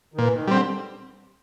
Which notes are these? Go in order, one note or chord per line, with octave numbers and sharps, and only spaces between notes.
D#3
A#2 E3
D#3
D3 G3 C4